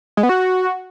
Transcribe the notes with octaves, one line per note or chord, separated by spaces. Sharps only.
G#3
B3
F#4